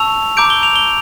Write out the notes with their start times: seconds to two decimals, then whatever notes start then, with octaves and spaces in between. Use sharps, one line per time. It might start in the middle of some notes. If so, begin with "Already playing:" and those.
Already playing: A5 C#6 E6 F7
0.37 A#5 D6 G6 D7
0.50 G7
0.63 F7
0.76 G7